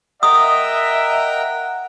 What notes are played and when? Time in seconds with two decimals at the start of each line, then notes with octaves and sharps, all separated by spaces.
0.23 A#4 D#5 E5 F#5 G5 A#5 D#6